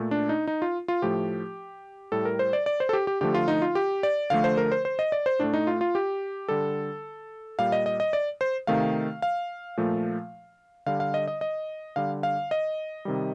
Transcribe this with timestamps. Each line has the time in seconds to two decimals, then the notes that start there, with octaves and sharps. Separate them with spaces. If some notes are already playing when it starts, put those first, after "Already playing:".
Already playing: A#2 A3
0.11 D4
0.29 D#4
0.47 D#4
0.62 F4
0.88 F4
1.02 A2 F3 A3 G4
2.12 A2 G3 A4
2.25 A#4
2.39 C5
2.53 D5
2.66 D5
2.80 C5
2.89 A4
2.93 G4
3.07 G4
3.21 D3 F3 A3 G4
3.34 F4
3.48 D#4
3.62 F4
3.75 G4
4.03 D5
4.30 D3 F3 A3 F5
4.44 C5
4.57 A#4
4.72 C5
4.85 C5
4.99 D#5
5.12 D5
5.26 C5
5.39 A2 A3 D4
5.54 D#4
5.67 F4
5.81 F4
5.95 G4
6.49 D3 G3 A4
7.58 A#2 G3 F5
7.72 D#5
7.86 D#5
8.00 D#5
8.13 D5
8.41 C5
8.67 C3 D#3 A3 F5
9.22 F5
9.77 A#2 F3 A3
10.86 D3 G3 F5
11.00 F5
11.14 D#5
11.28 D#5
11.41 D#5
11.96 D3 G3 F5
12.23 F5
12.51 D#5
13.05 C3 D#3 G3